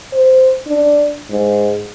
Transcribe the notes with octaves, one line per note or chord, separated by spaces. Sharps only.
C5
D4
G#2